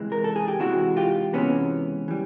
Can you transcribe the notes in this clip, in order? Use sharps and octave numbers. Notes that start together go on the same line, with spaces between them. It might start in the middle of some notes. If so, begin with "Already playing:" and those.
Already playing: C#2 C3 E3 G#3
A#4
A4
G#4
G4
C#2 C3 E3 G#3 E4 F#4
F4 G4
C#2 C3 E3 G#3 B3 C#4
E3 G3